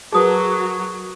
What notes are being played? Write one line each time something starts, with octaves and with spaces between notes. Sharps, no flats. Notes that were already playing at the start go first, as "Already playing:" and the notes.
F#3 F#4 G#4 A#4 B4 A5 D#6